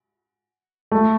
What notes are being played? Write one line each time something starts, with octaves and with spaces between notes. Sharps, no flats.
A3